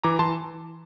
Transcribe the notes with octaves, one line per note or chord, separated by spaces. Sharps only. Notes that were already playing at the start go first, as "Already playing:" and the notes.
E3 A#5 D6
E3 A5 C6